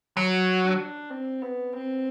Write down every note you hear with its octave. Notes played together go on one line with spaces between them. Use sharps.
F#3
D4
C4
B3
C4